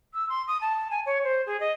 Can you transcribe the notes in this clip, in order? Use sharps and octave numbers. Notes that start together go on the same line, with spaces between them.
E6
C6
D#6
A5
G#5
C#5
C5
G#4
D#5